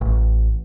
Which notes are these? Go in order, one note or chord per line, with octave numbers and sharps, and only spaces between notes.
A1